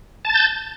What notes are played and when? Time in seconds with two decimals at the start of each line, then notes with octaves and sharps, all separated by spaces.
0.25 A5
0.29 A6
0.34 G6